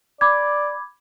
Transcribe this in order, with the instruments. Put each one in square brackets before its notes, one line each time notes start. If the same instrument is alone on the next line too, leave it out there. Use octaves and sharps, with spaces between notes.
[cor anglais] D5 [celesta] B5 D6 G#6